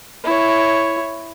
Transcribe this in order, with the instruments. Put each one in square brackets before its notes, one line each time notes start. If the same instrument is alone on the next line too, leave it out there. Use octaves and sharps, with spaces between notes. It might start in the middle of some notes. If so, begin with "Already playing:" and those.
[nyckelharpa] E4 C#5